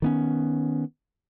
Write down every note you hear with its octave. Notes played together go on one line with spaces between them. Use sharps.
D#3 B3 C#4